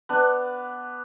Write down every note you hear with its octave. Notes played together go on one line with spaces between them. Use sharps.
B3 D4